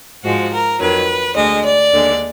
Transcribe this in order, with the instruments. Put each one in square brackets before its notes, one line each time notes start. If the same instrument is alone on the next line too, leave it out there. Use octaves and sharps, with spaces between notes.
[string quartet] G#2 F3 G#3 F#4
A#4
F2 D#3 F#3 B4
D2 D3 G#3 D#5
D5
D#2 D3 G#3